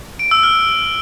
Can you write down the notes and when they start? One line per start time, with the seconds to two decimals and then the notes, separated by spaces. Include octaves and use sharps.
0.19 D7
0.31 E6
0.43 F6